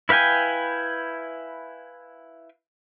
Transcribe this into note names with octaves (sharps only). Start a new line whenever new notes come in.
E4 B4 F5 G5 G#5